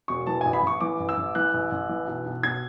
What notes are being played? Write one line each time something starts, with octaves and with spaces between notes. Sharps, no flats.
E1 C#6
E3 A5
A1 G#5
B5
A1 C#6
E3 D6
A1
E6
A1
E3 F#6
A1
A1
E3
B1
B1
B1 G#6